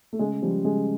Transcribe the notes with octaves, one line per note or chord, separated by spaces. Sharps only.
A3
C#3 G#3
F3 G3
C#3 G#3